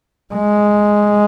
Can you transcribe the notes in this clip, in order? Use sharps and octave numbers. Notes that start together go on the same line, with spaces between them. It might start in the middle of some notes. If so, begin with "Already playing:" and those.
G#3